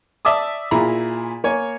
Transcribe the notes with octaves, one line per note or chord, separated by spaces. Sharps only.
D5 E5 A5 D6 D#6
A#2 E4 G#4 A#5 B5
A#3 C#5 G#5